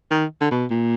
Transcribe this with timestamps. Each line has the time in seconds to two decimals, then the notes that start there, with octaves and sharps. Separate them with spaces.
0.11 D#3
0.41 D3
0.51 B2
0.71 A#2